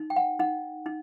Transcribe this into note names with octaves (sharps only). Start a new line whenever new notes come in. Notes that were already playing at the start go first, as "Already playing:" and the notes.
Already playing: D#4
G5
F#5
D#4 F#5
D#4